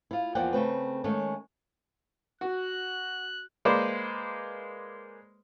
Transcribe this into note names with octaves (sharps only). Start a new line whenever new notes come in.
E4 F4
E2 F3 A#3 D5 F#5 G5
C#3 A3 C4 B4
D#3 G#3 A3 C#4
F#4 F#6
G#3 A#3 B4 C5 D5